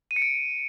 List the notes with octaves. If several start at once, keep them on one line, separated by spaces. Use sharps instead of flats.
D#7
C#7
D7